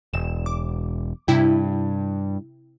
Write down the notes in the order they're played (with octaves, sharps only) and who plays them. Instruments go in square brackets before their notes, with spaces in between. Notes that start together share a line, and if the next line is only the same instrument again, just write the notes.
[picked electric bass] E1 [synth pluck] E7
[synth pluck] D6
[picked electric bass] G2 [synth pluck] C3 E4 G5